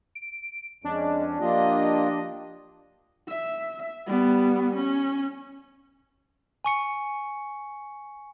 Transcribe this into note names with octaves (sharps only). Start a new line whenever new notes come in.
D7
F2 G#3 C#4 D4
F3 A#3 F4 G4 D#5
E5
G3 B3
C#4
G#5 C#6 C#7